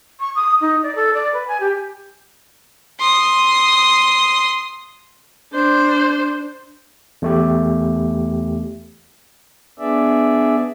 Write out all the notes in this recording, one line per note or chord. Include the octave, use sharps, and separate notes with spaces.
C#6
D#6
D#4
D5
A4
D5
B4
G#5
G4
C6 D#6
D4 C5
E2 A3 G4
B3 D4 G#4 D5 E5